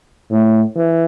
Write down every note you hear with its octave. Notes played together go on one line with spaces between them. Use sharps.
A2
E3